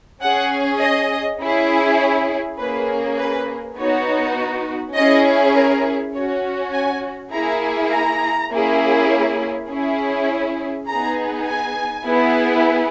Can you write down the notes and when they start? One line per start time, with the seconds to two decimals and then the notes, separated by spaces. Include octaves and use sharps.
0.21 C#4 G#4 F#5
0.81 D#5
1.39 C#4 E4 G#4
1.99 C#5
2.58 A#3 C#4 G#4 B4
3.18 B4
3.76 B3 D#4 F#4 C#5
4.95 C#4 E4 G#4 D#5
5.54 A#4
6.14 C#4 F#4 C#5
6.72 G#5
7.32 A#3 E4 G#4 A#5
7.91 A#5
8.50 A#3 C#4 E4 G#4
9.69 C#4 E4 G#4
10.87 B3 D#4 G#4 A#5
11.47 G#5
12.06 B3 E4 G#4